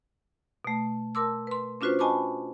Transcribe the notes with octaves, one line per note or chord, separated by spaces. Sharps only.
B2 A3
A#4 A5 C6 D6 E6
B4 C6
C#4 D4 F4 F#4 B4 C5
D#5 G#5 A5 B5 C#6 D6